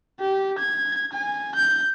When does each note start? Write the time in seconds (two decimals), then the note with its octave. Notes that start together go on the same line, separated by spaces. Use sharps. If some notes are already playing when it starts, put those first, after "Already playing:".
0.20 G4
0.59 G#6
1.13 G#5
1.55 G6